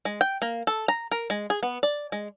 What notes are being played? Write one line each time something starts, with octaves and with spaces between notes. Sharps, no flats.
G#3
G5
A#3
A4
A#5
A#4
G#3
G#4
B3
D5
G#3